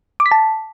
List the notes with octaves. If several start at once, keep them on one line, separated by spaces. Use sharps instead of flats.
D6
B6
A5